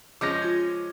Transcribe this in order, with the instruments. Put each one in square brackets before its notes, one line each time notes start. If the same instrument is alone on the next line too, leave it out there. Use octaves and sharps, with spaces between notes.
[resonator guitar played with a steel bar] F3 G#3 C#4 [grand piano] D6 A#6
[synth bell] F4 G#6